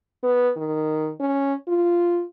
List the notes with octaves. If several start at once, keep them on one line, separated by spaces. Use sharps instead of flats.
B3
D#3
C#4
F4